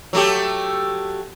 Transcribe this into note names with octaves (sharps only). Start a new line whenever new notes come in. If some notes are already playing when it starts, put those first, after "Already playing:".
F#3 A3 G4